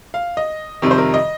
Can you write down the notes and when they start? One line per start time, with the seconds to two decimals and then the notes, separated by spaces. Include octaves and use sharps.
0.14 F5
0.37 D#5
0.82 F2 C3 D#3 G3
0.91 C5
0.98 A#4
1.14 D#5